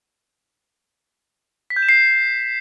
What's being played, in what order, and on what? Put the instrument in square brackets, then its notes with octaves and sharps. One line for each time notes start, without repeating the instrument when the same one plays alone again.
[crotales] B6
G6
E7
C7